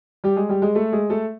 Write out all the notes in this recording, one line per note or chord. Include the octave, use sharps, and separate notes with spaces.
G3 G4
G#3 G#4
G3 G4
G#3 G#4
A3 A4
G#3 G#4
A3 A4